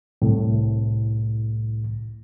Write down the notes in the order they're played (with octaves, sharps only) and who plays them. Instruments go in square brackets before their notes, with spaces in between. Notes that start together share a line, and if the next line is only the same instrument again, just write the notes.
[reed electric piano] C2 A2